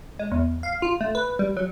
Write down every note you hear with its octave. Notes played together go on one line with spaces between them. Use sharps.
G#3
E2
F5
F4
A3
B4
G3
F#3